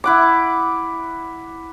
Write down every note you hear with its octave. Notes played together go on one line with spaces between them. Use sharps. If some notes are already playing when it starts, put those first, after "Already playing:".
E4 F#5 D6